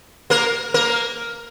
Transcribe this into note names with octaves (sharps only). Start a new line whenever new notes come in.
A#3 A#4
A#3 A#4